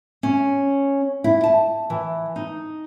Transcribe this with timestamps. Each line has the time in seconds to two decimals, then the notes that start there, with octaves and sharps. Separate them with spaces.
0.23 C#4
1.24 E4
1.44 A5
1.90 E3
2.36 D#4